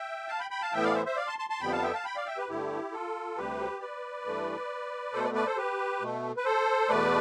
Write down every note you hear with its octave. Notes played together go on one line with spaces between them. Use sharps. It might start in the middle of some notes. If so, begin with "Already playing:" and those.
Already playing: E5 G5
F5 A5
G5 B5
G5 B5
F5 A5
A2 E3 B3 E5 G5
D5 F5
C5 E5
C5 E5
D5 F5
A5 C6
A5 C6
A5 C6
F2 D3 G3 B3 G5 B5
F5 A5
E5 G5
F5 A5
G5 B5
D5 F5
E5 G5
G4 B4
G2 D3 A3 E4 G4
F4 A4
D2 C3 G3 G4 B4
B4 D5
G2 E3 A3
B2 A3 A4 C5
B4 D5
B4 D5
A4 C5
G4 B4
B2 A3
B4
A4 C5
E2 B2 A3 B4 D5